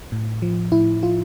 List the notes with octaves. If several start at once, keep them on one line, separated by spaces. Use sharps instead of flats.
A2
F3
A2 E4
F3 F4